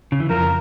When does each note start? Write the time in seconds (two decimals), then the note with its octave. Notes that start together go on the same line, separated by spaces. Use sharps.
0.12 C#3
0.20 E3
0.29 F2 F3 A#4